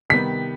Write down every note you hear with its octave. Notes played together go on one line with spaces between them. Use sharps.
C3 D#3 G3 B3 B6